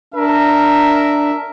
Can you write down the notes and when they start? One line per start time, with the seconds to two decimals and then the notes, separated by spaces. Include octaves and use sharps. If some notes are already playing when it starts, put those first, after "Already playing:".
0.14 D4 A#4 E5